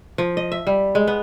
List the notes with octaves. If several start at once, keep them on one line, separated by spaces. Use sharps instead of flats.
F3
D#5
E5
G3
G#3
B3